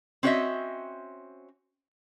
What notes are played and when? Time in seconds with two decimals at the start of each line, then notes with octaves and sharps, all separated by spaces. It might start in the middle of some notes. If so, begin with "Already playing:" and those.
0.23 C4 C#4 F#4 C#5 D#5 E5